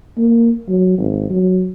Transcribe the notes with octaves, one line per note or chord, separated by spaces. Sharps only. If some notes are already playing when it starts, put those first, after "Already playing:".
A#3
F#3
G#1
F#3